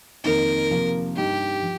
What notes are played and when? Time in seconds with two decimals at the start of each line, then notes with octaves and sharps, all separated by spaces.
0.24 F2 D#3 A#3 D#4 A#4
0.70 C3 F3 A#3
1.16 G2 G3 D#4 G4
1.63 F3